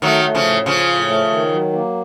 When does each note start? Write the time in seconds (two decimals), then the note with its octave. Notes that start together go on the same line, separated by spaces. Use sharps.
0.02 D#3 F#3 A3
0.24 A3
0.35 C#3 F3
0.45 A2
0.66 C#3 F3 F4
0.88 A2
1.09 A3
1.30 D#3
1.52 F#3
1.73 A#3